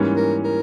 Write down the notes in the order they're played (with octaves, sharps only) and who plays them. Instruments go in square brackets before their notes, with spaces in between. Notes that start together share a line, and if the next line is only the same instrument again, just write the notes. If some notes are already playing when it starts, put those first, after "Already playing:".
Already playing: [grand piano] G#2 E3 G3 A#3 C#4
[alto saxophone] A#4
A#4